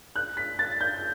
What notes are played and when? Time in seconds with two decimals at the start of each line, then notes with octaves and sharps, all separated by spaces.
0.16 F#6
0.37 B6
0.59 A6
0.81 G6